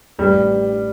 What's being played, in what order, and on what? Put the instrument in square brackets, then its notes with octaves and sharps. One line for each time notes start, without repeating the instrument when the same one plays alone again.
[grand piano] A1 [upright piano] G3